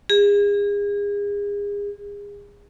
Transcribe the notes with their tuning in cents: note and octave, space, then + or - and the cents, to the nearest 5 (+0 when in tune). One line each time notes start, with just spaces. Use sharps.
G#4 -35